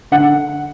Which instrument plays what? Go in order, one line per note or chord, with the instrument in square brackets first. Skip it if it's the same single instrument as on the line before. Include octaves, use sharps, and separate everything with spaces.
[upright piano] D3 F#5